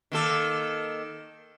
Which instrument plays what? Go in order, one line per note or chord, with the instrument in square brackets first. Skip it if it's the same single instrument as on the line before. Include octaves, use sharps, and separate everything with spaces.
[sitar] D#3 A#3 A4